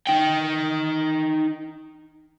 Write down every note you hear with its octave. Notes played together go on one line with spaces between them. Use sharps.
D#4 G5